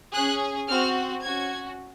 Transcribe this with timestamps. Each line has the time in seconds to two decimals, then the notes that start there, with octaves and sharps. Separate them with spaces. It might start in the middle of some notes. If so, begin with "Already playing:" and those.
0.14 C#4 G#4 F#6
0.68 C4 F#4 F6
1.23 C#4 F#4 G#6